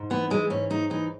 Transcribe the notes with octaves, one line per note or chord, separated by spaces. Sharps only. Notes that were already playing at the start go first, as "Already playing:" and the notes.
Already playing: G#2
E3 B3
E3 G#3
G#2 C#4
G#2 D#4
E3 D#4